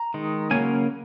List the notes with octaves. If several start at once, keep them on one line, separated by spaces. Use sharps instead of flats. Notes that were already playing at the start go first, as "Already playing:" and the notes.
Already playing: A#5
D#3 G#3 D#4
C#3 F#3 A#3 C#4 G#5